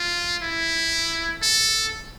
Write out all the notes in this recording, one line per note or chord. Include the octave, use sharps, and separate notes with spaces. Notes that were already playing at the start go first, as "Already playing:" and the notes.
Already playing: F4
E4
A4